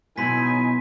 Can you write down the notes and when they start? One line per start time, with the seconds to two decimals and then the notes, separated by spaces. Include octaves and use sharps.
0.18 B2 F#3 D#4 E4 G#5 C6 B6